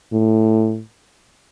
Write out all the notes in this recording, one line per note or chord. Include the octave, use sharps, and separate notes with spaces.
A2